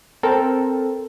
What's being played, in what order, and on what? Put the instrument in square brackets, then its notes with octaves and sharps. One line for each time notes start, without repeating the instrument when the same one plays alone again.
[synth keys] C4 A4 A#4